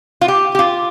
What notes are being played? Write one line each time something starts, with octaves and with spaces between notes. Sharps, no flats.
F4
G4
G4
F4